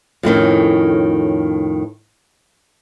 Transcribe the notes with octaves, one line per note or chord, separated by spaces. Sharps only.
F2 A2 D#3 C#4